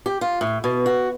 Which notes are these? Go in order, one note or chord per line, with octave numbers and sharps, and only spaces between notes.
G4
F4
A2
B2
F#4